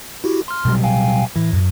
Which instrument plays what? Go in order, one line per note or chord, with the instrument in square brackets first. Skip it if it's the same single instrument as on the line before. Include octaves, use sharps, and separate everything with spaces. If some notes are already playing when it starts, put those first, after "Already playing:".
[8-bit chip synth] E4 F#4 G4
C6 F6
[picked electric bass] B2 F#3 G3
[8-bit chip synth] F5 G5 G#5
[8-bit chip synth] A2 [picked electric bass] E3
[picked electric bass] F#2